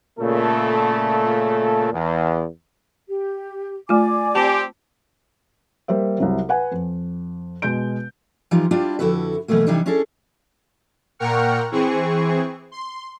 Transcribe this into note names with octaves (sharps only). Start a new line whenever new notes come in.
A#2 C#3 A3 A4
E2
G4
A3 F4 D5 G#5 D6
C4 G4 A5
G3 A#3 C5 E5
C2 C3 F#3
B4 F#5 G#5
F2
B2 G#3 G6 D7
E3 F3 G3 D#4 F4
G3 D4 E4 F4 G4 D5
F2 D3 E4 F#4 A4 B4
B2 E3 F#3 A3 A#3
C3 E3 G3 D4 D#4
C#4 D4 E4 G#4 A4
A#2 A#4 F#5 G5 C#6 F6
E3 C4 G#4 C#6
C6